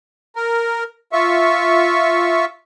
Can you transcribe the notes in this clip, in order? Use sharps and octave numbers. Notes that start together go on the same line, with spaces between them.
A#4
F4 E5 C#6